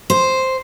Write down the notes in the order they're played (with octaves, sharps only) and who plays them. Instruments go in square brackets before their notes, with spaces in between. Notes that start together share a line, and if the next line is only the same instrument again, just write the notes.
[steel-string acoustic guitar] C5